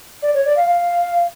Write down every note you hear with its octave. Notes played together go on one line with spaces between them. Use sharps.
D5
C#5
D5
F5
F5